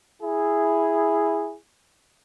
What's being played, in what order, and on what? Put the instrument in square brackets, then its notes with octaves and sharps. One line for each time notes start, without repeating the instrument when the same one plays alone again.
[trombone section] E4 G#4